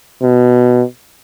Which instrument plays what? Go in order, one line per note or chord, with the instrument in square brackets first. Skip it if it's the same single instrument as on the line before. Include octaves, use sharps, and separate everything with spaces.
[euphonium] B2